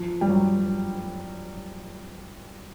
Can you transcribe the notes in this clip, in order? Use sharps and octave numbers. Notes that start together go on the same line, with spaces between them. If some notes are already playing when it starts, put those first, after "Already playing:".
Already playing: F3
G3
F#3